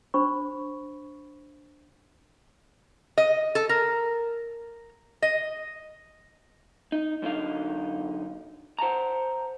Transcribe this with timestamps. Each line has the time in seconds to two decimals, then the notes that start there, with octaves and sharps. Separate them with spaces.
0.14 D4 C5 B5 C#6
3.18 D#5
3.55 A4
3.69 A#4
5.22 D#5
6.92 D#4
7.22 F#2 D3 D#4 F5
8.79 C5 F#5 A5 A#5